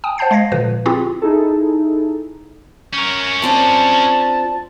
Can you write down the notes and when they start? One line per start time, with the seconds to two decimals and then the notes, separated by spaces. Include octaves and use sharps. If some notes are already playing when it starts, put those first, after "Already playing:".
0.04 G5 G#5 D#6
0.18 C5 F#5 A5 G6 C7
0.31 G#3 F5 G#6 A#6 C7
0.52 A#2 D3 F3 B4
0.86 C4 E4 F4 G4 G#4
1.22 D#4 E4 G#4 A4
2.94 C#4 A#4 C#6
3.42 F3 C4 D4 A5